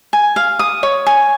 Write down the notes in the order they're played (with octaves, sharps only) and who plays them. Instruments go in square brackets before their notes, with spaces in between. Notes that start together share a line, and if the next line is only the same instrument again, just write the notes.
[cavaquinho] G#5
F5
D#6
C#5
G#5